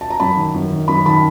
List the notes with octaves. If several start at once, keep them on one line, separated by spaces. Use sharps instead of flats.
A5
A#5
F#2 A5 B5
D#3
F#2
D#3
F#2 B5
D#3 A5 B5